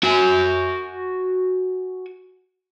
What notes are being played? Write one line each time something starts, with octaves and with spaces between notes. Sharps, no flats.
F#4 G#5